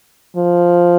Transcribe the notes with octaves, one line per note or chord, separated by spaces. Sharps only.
F3